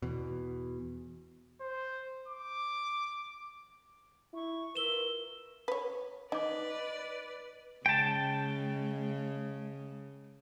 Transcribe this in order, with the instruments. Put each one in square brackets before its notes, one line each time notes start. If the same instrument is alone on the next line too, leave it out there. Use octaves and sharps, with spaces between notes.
[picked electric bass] E2 B2
[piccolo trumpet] C5
D6
[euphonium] E4 [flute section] C#6
[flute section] F4 E5 E6 [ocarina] A#4 [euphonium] B4 [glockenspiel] E7 G7
[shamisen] B4 C#5
[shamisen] D#4 [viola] B4 D5 [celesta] D#5 D6
[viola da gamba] C#3 [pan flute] G#3 [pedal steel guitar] G5 A5